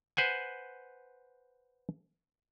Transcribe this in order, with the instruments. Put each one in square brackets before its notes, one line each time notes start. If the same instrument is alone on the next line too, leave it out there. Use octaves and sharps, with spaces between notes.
[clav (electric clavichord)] B4 C5 F#5 G#5